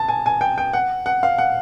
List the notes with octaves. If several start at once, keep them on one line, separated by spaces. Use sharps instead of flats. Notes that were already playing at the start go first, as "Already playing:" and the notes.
Already playing: A5
G#5
G#5
G5
G5
F#5
F#5
F5
F#5